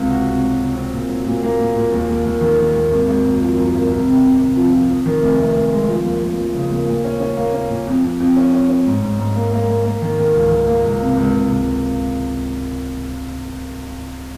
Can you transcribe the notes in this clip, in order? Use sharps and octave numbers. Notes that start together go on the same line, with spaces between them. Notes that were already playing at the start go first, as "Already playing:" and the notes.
Already playing: C#2 C3
F#4
C3
F#3
C3
C4
A#2
F#3
A#2
A#3
A#2
A#2
D#2
D#2
D#2
D#3
D#3
D#2
G#1
G#1
F#2
F3
F#2
G#1
C2
C3
C3
C3
F3
F3
F2
D#3
F1
F1
F1
G#3
F3
D#2
D#2
F3
C#3
D#2
A#2
C#4
C#4
A#3
C#4
A#2
F2
F2
F2
C#4
C#4
C#4
G#2
G#2
G#2
A#3
A#3
A#3
A#3
D#3
D#3
C#2
D#3
A#3
C#2
C3
C#2
C#2
C#2